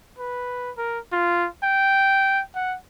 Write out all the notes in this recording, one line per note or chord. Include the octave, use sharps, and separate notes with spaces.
B4
A#4
F4
G5
F#5